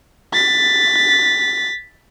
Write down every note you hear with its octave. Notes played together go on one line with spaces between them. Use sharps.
A6 B6